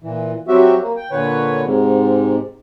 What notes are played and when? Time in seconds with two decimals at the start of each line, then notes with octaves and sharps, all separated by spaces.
0.02 A#2 E3
0.48 F#3 C4 F#4 G4 E5
0.81 A#3
0.96 G5
1.11 A#2 D3 B4 C#5
1.63 G#2 C3